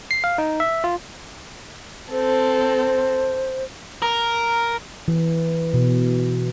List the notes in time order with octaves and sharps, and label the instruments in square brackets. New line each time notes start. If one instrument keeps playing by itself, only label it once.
[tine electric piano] C7
F5
D#4
E5
F4
[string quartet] C4 A4 [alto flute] C5
[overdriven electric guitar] A#4
[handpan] E3
B2